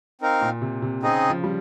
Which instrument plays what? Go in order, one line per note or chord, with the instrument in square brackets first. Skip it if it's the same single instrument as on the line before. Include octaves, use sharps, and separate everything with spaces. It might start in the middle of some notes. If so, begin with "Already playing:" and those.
[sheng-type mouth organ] C4 D#4 A#4 F5
[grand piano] A#2
C3
C3
[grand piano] C#3 [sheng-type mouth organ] C4 D#4 G#4 D#5
[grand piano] F3
G3